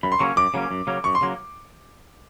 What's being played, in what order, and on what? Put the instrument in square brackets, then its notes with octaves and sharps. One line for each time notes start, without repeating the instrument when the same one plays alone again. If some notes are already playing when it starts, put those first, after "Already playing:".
[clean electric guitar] F#2 [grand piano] B5
[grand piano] C6
[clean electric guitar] C#3 F#3 A#3 C#4 [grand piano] C#6
[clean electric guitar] F#2 [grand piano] D6
[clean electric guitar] C#3 F#3 A#3 C#4
F#2
C#3 F#3 A#3 C#4
[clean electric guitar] F#2 [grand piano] C#6
[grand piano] C6
[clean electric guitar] C#3 F#3 A#3